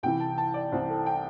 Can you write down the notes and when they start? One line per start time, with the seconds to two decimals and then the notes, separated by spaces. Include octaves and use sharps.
0.03 C2 C3 E3 G5
0.20 A5
0.38 A5
0.54 D5
0.72 C2 C3 E3 C5
0.89 A4
1.06 G5